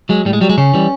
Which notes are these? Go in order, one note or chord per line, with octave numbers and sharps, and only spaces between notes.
F#3 G#3
A2 G3
G#3
F#3 G3
G#3
C#3 C#4
E3 G3